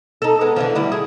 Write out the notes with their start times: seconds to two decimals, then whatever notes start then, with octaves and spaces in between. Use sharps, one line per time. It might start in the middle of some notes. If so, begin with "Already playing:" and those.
0.22 D#4 A4
0.41 G#3 B3
0.56 D3 E3 F3
0.75 D2 G3 E4
0.92 G#4